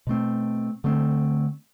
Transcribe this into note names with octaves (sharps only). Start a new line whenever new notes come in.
B2 A3 C4
D3 A3 C4